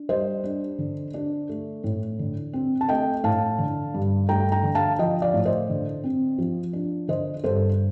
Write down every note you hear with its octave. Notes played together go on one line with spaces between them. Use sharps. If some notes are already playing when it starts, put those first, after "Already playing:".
Already playing: D4
G3 C5 D#5
D4
D3
D4
A3
A2
D3
C4
A5
A3 D#5 G5
A2 F5 A5
D3
G2
A3 G5 A#5
G5 A#5
D3
F5 A5
F3 D#5 G5
D5 F5
A2
C5 D#5
D3
C4
F3
D4
D3 C5 D#5
G2 A4 C5